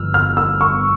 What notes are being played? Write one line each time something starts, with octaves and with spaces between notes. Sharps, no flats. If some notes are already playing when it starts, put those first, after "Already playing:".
Already playing: G1 G2 F3 E6 F6
F6
E6
C#6